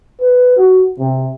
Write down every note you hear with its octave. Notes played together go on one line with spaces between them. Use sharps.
B4
F#4
C3